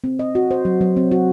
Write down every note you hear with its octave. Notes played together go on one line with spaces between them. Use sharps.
C4
D#5
F#4
C5
F#3
F#3
C4
F#4